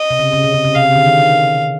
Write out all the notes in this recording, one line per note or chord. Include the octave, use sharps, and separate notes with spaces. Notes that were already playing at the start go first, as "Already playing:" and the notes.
Already playing: D#5
C3
C#3
C#3
C3
C#3
C#3
C3 F5
C#3
D3
D#3